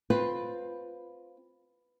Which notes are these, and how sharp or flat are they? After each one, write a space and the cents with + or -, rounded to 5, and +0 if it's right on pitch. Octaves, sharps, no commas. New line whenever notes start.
C4 +0 F4 +15 B4 +0